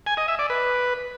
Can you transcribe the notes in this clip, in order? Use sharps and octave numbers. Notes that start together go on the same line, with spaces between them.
G#5
D#5
E5
D5
B4